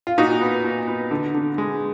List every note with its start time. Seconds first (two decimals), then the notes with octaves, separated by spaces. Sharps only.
0.07 F4
0.18 A#2 D#4 F#4
0.41 B3
0.64 A#2
0.88 B3
1.11 D3
1.34 D3
1.58 G#3